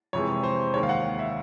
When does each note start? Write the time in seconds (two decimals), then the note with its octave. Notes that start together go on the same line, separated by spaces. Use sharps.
0.13 F2 C3 E3 G#3 C#5
0.44 C5
0.74 D#2 D#3 G#3 C#5
0.83 F5
0.89 F#5
1.19 E5